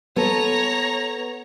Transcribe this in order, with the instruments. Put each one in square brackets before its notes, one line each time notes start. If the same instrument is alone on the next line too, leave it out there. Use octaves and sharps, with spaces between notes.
[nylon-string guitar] B3 A4 [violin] C#5 A#5